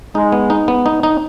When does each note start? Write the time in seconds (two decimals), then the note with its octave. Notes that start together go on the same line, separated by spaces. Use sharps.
0.15 G#3 D#4
0.32 B3
0.50 D#4
0.68 B3
0.86 D#4
1.03 D#4